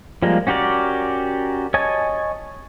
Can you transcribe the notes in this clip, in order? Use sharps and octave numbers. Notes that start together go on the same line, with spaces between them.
F3 G3 G#3 A#3
C#4 F#4 G4 A#4 D5
C#5 D#5 G#5 A5